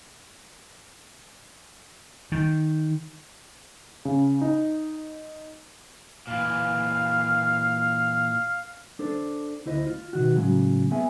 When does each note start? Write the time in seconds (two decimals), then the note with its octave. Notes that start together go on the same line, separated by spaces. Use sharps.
2.32 D#3
4.05 C#3
4.41 D#4
6.27 A#2 E3 F5
8.99 D4 A4 C5
9.66 D2 E4 C5 D#5
9.87 F4
10.13 B2 D#3 F#4
10.36 A2 C#3 F#3 G#3
10.91 B3 G#4 E5 G#5